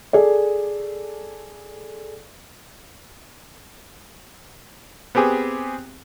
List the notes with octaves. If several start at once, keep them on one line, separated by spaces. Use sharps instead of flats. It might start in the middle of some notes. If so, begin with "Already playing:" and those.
G#4 A4 D5
B3 C4 G4 G#4